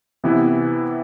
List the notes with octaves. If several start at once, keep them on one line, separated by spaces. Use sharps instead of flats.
C3 E3 B3 E4